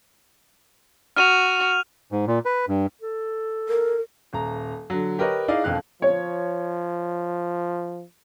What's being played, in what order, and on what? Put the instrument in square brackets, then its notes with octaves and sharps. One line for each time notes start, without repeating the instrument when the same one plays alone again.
[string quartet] F#4 [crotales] F6 D#7 F7
[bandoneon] G#2
A#2
B4
G2
[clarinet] A4
[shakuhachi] A#4
[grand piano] D#1 A#5
D3 F#3
G4 A#4 B4 C#5 D#5
D#4 E4 G#4 D5 F5
E1 F2 F5 F#6
[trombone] F3 [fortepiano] C#5